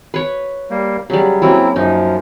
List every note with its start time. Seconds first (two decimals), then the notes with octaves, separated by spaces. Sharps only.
0.14 B4 C#5
0.70 G3 A#3
1.10 C#3 F#3 G3
1.42 F#3 A#3 C4 C#4 E4
1.76 F#2 F3 D#4